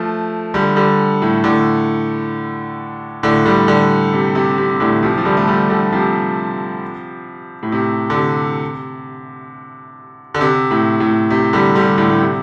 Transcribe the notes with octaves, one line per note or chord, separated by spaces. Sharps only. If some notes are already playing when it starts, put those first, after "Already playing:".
Already playing: F3 A3
D3 G3
D3 G3
A2
A2 D3
A2 D3
D3 G3
D3 G3
C3
C3
C3
A2 D3
C3 F3
F3
D3 G3
A3
D3 G3
D3 G3
C3 F3
A2
C3
D3
C3
D3
C3
A2
A2
C3
D3 G3
D3 G3
A2 D3
A2
C3